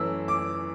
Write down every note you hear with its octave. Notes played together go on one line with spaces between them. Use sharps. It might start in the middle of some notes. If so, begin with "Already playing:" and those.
Already playing: F#2 E3 A3 E6
D6